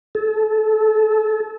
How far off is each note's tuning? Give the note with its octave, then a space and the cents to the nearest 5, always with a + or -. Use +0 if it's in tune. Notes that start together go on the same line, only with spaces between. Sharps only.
A4 -25